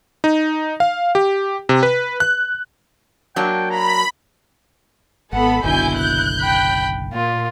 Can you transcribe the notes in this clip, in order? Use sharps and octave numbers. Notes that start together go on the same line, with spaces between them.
D#4
F5
G4
C3
B4
F#6
F#3 A#3 D4 G5
A#5 B5
G#1 B3 A4 F#5 B5
F#1 B1 B2 D3 E4 G#5 G6
F#6 G6
G5 B5
A#2 F4